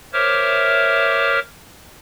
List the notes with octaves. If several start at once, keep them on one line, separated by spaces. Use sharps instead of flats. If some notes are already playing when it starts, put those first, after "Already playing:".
A#4 C5 C#5 E5 D6 F6